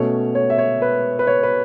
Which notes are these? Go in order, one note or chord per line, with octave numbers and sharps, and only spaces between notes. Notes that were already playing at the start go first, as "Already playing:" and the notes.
Already playing: B2 A3 C#4 C#5
C#5
E5
C#5
B4
B4
C#5
B4